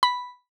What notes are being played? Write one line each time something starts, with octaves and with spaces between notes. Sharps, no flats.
B5